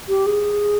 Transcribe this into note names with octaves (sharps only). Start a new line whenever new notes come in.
G4
G#4